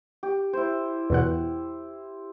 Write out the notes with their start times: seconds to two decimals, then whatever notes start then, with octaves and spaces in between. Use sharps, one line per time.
0.23 G4
0.53 E4 C5
1.10 E2 B2 F#5